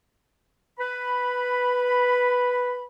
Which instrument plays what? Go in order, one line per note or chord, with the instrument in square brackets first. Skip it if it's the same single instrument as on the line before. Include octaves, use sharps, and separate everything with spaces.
[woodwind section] B4 B5